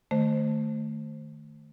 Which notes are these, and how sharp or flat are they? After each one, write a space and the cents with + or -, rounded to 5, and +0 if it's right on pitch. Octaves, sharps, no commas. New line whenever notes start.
D#3 -25 A3 +0 C5 +0